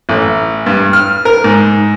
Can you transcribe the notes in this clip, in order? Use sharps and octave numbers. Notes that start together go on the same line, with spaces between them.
A1
G2
F6
A#4
G#2